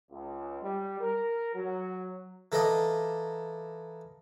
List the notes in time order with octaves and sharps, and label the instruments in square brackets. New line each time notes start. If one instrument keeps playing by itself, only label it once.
[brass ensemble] C#2
G3
A#4
F#3
[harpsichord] E3 A4 A#4 D5 D#5 F5